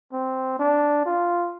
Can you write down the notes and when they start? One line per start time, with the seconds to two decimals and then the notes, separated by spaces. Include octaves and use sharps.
0.13 C4
0.59 D4
1.06 F4